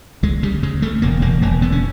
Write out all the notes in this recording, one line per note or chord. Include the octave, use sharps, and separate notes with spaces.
D2 G#3
C#3 G3
C#3 G#3
C#3 A3
E1 A#3
E1 A#3
E1 A#3
D3 B3
C#4